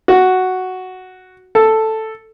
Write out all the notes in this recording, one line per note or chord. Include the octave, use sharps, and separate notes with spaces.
F#4
A4